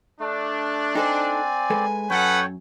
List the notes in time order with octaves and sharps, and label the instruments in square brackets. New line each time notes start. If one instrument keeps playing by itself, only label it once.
[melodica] A3 [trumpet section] D4
[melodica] C4 D5 [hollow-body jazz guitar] D#4 A4 C5 [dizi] G#5
[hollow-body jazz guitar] G#3 A4 B4
[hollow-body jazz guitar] F#2 [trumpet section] A4 B4 F#5 [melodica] C#5 G5